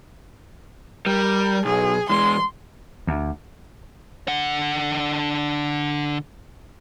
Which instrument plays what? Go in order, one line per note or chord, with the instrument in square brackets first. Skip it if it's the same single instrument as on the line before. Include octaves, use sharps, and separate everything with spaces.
[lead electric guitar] G3 [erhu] A#4
[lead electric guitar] B1 [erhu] G#4
[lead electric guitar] E2 G#3 [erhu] C6
[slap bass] D2
[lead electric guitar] D3 F#5